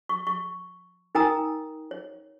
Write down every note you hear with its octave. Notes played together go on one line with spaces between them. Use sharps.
C#6
C#6
D#4 A#4 G5 G#5 A#5 D#6
C#5